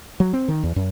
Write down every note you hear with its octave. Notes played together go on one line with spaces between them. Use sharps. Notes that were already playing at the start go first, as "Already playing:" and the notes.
F#3
C4
D#3
E2
F#2